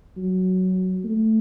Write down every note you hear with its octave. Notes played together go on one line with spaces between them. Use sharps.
F#3
A3